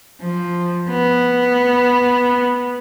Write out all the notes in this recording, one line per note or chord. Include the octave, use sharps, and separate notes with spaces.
F3
B3